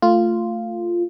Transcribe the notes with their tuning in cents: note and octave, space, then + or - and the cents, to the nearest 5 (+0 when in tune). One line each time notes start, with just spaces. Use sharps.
A3 +20 F4 -5